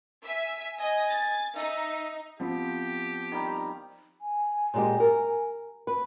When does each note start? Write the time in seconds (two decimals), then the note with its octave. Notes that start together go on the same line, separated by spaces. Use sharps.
0.24 E5 G#5
0.80 D#5 G#5
1.11 A6
1.55 D#4 E5
2.40 F3 B3 C4 G4
3.32 D#3 G3 A#5
4.21 G#5
4.74 A#2 G#3 G4
5.00 A#4
5.87 B4